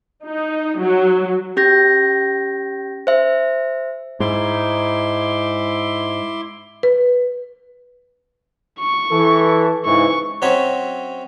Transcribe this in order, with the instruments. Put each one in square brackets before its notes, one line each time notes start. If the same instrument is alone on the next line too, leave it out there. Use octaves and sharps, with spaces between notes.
[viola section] D#4
F#3
[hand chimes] C#4 G4 G6 A#6
C5 E5
[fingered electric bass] G#2 [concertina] E4 C6 D6
[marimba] B4
[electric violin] C#6
[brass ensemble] E3 A4
[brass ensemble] G#2 C#3 E3 [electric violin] C#6
[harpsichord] F#3 C4 C#4 C#5 D#5 E5